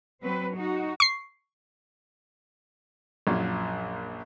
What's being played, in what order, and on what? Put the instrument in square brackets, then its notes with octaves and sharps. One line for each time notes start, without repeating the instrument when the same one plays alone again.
[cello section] F#3 C4 B4
D#4 F#4
[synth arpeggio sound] C#6 C7
[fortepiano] A#1 F#2 A#2